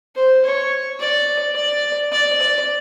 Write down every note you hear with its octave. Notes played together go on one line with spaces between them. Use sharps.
C5
C#5
D5
D5
D5
D5